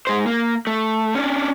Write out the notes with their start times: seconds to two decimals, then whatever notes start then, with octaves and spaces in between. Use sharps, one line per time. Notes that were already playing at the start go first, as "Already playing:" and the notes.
0.07 G#3 C5
0.26 A#3
0.67 A3
1.15 C#4 D4